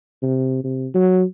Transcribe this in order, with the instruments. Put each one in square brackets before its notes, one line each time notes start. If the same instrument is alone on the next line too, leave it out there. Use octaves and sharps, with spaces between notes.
[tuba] C3
C3
F#3